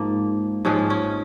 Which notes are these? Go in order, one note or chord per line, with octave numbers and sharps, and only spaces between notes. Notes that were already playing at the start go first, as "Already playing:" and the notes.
Already playing: G#2 F3 A#3
G#2 F3 G#3 C#4
C#4